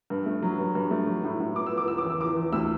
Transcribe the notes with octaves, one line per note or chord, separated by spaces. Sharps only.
G2
A3
F#3
G2
G2
A3
F#3
A2
A2
B3 D6
E6
B3
D6
C#2 E6
D6
E2 E6
E2 D6
E2
D2 E6